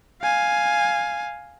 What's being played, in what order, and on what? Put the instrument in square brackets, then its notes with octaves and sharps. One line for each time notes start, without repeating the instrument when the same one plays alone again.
[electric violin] F5 G#5